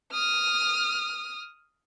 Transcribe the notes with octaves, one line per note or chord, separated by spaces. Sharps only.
D#6 F6